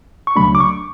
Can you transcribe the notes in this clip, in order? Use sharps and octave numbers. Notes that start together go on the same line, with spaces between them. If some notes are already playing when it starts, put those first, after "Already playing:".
C#6
D2 C#3 F#3 A3 D4 B5
D6
C#6